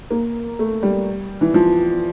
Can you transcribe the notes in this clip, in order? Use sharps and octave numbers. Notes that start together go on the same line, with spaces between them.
A#3
A3
G3
E3
F3